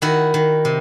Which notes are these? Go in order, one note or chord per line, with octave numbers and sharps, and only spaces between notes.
D#3 E4 F#4
D#3
C3